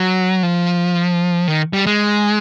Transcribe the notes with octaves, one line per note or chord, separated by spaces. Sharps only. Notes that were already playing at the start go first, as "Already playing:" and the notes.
Already playing: F#3
F3
D#3
G3
G#3